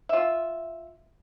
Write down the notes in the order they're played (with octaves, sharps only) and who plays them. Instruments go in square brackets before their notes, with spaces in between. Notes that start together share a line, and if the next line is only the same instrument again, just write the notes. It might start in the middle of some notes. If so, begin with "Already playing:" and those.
[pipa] F4 E5